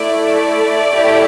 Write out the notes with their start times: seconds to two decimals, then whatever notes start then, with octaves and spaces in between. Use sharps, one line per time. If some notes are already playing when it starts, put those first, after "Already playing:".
Already playing: A3 E4 A4 D5
0.39 D5
0.94 A3 E4 G4